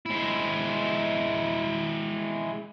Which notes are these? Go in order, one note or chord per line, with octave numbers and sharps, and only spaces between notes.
G#3 E4